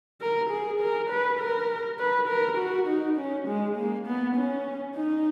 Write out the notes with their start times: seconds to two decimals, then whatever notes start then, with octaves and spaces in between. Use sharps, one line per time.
0.21 A#4
0.50 G#4
0.80 A#4
1.10 B4
1.39 A#4
1.99 B4
2.28 A#4
2.58 F#4
2.88 D#4
3.17 C#4
3.47 G#3
3.77 A#3
4.06 B3
4.36 C#4
4.95 D#4